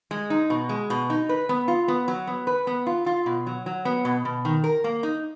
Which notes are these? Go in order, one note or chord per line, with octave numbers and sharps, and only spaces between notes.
G#3
D#4
B2
G#3
B2
D#4
B4
B3
F4
B3
F#3
B3
B4
B3
F4
F4
B2
F#3
F#3
B3
B2
B2
D#3
A#4
A#3
D#4